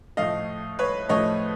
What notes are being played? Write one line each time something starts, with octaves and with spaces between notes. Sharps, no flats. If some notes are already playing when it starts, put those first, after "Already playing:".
A2 F3 A3 D#5 F5
B4 C#5
A2 F3 A3 C#5 D#5